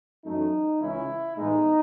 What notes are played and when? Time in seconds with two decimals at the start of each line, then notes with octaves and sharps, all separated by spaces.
0.25 F#2 E3 A3 C#4 D#4
0.81 C#2 C#3 E3 G#3 C#4 E4
1.35 A2 E3 G#3 B3 D#4